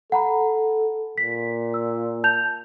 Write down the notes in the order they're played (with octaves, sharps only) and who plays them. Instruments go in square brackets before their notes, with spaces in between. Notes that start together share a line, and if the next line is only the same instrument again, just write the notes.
[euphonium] A4 [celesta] F#5 A#5 B5
[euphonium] A#2 [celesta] B6
[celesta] E6
A5 G6 F7